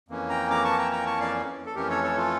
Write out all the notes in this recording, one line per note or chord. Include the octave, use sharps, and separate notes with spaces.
F2 E3 A#3 C#4
G5 A#5
A#5 D6
A5 C#6
G5 A#5
G5 A#5
A5 C#6
D5 F5
A4
F2 E3 A3 C#4 G4 A#4
A4 C#5
A4 C#5
F4 A4